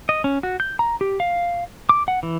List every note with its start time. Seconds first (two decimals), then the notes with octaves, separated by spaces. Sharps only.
0.09 D#5
0.24 C#4
0.43 F#4
0.60 G6
0.79 A#5
1.01 G4
1.20 F5
1.89 D6
2.08 F#5
2.23 E3